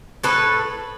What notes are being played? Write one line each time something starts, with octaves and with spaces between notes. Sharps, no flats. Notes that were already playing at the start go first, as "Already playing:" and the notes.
A2 A4 B4